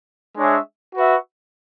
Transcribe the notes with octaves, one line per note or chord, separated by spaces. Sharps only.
G#3 D4 G#4 C#5 E5
F#4 B4 E5